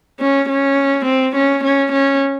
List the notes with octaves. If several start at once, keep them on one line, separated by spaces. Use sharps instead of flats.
C#4
C#4
C4
C#4
C#4
C#4